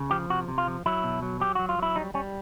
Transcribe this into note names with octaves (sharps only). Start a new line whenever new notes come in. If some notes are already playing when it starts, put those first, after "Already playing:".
Already playing: C#3
F3 G4
C3 F#4
C3
F4
F3
F#3 E4
B2
F#3
F#3 G4
F#3 F#4
F4
F#3 E4
G3 D#4
G3 C#4